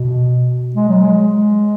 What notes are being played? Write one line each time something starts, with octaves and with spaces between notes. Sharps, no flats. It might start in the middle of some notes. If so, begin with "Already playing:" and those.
Already playing: B2
G#3
F#3
G#3